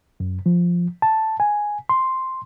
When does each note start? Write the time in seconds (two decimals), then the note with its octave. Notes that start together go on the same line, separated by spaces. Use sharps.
0.20 F#2
0.46 F3
1.02 A5
1.40 G#5
1.89 C6